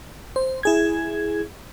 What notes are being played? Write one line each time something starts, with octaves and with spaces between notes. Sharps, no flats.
C5
E4 G#4 G#6